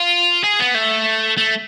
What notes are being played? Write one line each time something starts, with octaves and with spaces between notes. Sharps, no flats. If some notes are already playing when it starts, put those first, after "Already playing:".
Already playing: F4
G#4
B3
A3
A3